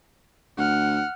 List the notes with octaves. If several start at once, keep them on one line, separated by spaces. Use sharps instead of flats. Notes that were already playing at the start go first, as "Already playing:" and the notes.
D2 F#5 F6